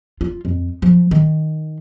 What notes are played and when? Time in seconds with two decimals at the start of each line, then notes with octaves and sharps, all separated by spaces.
0.21 F4
0.45 F2
0.82 F3
1.11 D#3